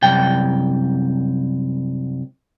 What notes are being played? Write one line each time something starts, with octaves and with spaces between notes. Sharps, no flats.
C2 F#2 G5